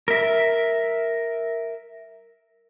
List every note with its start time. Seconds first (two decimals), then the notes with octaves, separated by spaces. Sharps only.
0.08 A#4 E5